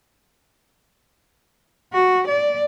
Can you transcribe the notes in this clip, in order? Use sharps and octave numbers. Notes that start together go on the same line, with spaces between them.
F#4
D5